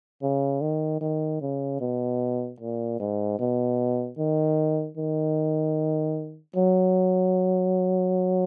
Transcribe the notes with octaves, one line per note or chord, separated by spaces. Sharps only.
C#3
D#3
D#3
C#3
B2
A#2
G#2
B2
D#3
D#3
F#3